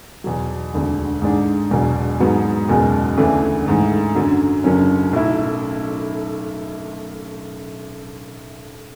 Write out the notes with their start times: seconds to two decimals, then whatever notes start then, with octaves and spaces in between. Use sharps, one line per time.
0.24 E2 B2 F#3
0.74 E1 D2 D3
1.22 G#2 G#3 D4 G#4
1.70 E1 E2 B2 F#3
2.20 G#2 F#3 B3 F#4
2.68 F#1 E2 B2 G#3
3.17 D2 C#3 E3 A3 D4
3.66 G#2 E3 A3
4.15 F#2 D3 F#3
4.64 F#1 F#2 D3 F#3 C#4
5.13 B1 A2 F#3 A3 E4